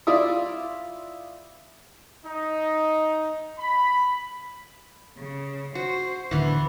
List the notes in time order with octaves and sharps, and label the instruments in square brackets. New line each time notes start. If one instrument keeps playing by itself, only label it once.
[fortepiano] E4 F4 D5 E5 D#6
[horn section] D#4
B5
[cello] C#3
[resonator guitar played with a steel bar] F#4 [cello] C5
[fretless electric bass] D1 D3 [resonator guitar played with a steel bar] E3 B3